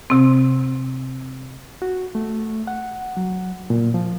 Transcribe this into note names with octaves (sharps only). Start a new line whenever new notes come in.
C3 C4
F#4
A3
F#5
F#3
A#2
F3